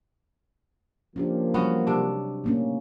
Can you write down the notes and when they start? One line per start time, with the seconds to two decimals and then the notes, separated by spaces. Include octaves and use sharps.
1.16 F3 A#3 C#4 D4 G4
1.54 F#3 G3 B3 C#4 F#4
1.87 C3 D4
2.44 A3 A#3 C#4